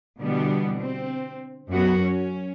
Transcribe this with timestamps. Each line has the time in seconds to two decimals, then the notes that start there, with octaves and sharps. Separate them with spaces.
0.19 B2 D3 E3 G3 B3
0.81 C4
1.70 F#2 B3 F#4
2.02 C#4